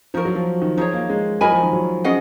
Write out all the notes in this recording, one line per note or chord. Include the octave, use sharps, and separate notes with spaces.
F3 D#4 F#4 A#4
F#3
F3
D#3
F3 D#4 G#4 C#5
A#3
G#3
F#3 A#4 D#5 G#5 B5
F3
D#3
F#3
C#4 G#4 D#5 F#5